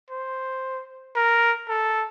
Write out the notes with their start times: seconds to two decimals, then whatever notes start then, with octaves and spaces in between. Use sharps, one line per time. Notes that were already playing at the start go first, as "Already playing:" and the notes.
0.10 C5
1.16 A#4
1.69 A4